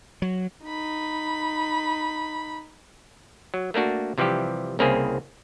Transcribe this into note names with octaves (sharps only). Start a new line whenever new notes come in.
F#3
D#4 B5
F#3
A3 A#3 D4 F#4
C3 E3 F3 G3 G4
C2 C#3 A#3 C4 E4 G#4